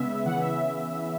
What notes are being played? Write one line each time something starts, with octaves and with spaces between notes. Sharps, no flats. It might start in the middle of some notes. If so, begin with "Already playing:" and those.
Already playing: C#3 G#3 B3 E5
C#3 E3 B3 F#5
E5